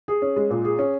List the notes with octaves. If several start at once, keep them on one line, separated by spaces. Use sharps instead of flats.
G#4
C#4
G#3
A#2
G#4
C#4